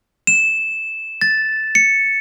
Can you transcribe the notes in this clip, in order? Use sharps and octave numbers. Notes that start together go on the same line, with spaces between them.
E7
A6
C#7